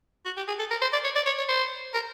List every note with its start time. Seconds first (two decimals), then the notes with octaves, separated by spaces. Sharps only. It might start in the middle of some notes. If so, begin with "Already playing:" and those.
0.25 F#4
0.37 G4
0.48 G#4
0.59 A4
0.71 A#4
0.82 C5
0.93 D5
1.04 C#5
1.15 D5
1.26 C#5
1.38 C#5
1.49 C5
1.94 A#4